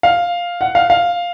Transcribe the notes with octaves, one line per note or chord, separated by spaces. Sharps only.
F5
F#5
F5
F5